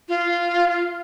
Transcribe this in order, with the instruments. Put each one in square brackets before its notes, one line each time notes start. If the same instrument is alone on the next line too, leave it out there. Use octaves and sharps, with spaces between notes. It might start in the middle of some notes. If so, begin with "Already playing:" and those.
[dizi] F4